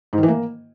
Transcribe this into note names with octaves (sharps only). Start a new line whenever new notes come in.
G#2
D#3
E3
A#3